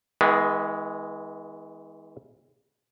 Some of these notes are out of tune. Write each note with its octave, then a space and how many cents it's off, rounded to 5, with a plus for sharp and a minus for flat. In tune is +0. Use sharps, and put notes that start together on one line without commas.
E3 -40 G#3 +0 B3 +5